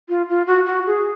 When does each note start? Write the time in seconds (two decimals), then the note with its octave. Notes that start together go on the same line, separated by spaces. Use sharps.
0.09 F4
0.29 F4
0.47 F#4
0.66 F#4
0.86 G#4